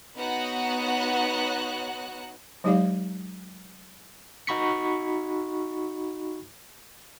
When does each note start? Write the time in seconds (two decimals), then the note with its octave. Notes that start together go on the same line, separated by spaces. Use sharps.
0.18 B3 D#4 F#4 C#5 F#5 F#6
2.64 F#3 G#3 D#4 G4 D5 F5
4.47 D#4 F#4 B5 C#6 B6 C#7